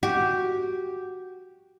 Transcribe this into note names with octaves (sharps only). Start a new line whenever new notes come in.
F#4 G4